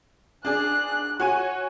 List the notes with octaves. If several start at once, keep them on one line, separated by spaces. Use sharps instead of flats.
D4 G#4 F#6
F#4 C#5 G#5 D#7